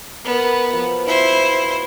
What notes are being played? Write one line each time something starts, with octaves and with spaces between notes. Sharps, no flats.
B3 A#4
B2 F3
B2 E4 C5